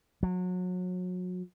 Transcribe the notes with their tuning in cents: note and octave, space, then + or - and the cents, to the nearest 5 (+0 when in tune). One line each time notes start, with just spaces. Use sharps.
F#3 -30